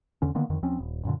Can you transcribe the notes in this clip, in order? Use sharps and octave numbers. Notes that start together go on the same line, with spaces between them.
E2 D3 C#4
D3 D#3 A#3 B3
F2 D3 D#3
D#2 F3 C4 C#4
D#1
F#2 A#2 D3